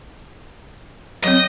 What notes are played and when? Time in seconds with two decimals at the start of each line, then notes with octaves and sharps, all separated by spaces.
1.24 F#3 C4 D#5